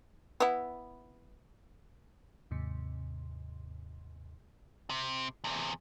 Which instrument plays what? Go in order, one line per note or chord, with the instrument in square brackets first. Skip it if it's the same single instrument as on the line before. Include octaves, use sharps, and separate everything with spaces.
[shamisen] B3 E4
[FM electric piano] D#2 G#2 C3
[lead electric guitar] C3
E2 C3